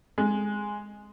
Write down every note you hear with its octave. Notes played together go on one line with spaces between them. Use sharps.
G#3